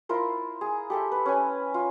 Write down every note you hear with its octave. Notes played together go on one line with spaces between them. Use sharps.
E4 F4 A#4 C5
G#4
G4 A4 E5
B4
C#4 B4 G#5
F4